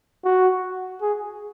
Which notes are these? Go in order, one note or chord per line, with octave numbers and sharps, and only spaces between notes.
F#4
G#4